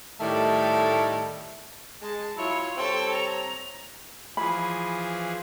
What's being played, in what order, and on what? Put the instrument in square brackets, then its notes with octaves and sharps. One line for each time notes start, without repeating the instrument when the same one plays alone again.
[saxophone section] A2 D#3 G3 A3
[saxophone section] G#3 [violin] A5
[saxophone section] F#3 E4 [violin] F4 C#5
[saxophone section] G3 C4 C#5 [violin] A4 G5
[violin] A#5
[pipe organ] E3 F3 G#4 [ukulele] B5